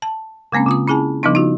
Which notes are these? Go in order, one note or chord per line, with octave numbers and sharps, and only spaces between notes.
A5
C#3 G#3 A#3 C4 C#4
C#3 F4 D#6
C#4 E4 G#4 G#5 A5
C#3 F3 G3 B3 D4 D#4
D#4 F4 F#4